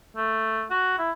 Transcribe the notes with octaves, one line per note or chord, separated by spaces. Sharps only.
A3
F#4
E4